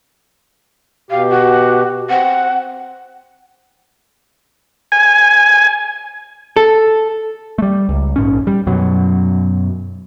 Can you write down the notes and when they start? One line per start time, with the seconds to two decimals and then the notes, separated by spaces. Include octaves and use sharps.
1.11 B2 G4 F5
1.30 F#4
2.09 C4 F#5
4.92 G#5
6.56 A4
7.58 G3 A3
7.89 C#2
8.16 A#1 G#2 C#4
8.47 G3
8.67 F#2 B2 F#3